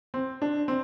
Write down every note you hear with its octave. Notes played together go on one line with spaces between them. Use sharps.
C4
D4
C4